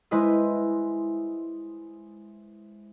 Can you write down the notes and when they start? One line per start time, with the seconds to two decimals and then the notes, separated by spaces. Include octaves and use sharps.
0.11 G#3 E4 B4 C5 D#5